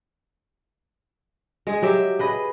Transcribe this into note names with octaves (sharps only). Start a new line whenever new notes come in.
G#3 G#4
F#3 G4 E5
G#4 B4 D#5